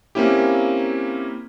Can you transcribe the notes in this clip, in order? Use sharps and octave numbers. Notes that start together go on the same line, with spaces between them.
A#3 C4 C#4 E4 G4